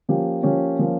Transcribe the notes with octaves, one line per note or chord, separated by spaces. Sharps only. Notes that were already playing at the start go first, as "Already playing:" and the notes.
F3 A#3 C#4 G4
F3 A#3 C#4 G4
F3 A#3 C#4